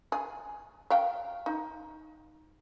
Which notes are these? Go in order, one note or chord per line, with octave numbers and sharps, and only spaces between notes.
G#4
E5 F5 G5
D#4